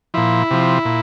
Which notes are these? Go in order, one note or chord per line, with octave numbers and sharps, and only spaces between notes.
A#2 F3 E4
C3 F3
A#2